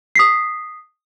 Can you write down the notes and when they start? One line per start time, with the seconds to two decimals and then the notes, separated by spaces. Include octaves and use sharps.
0.15 D#6 B6 C7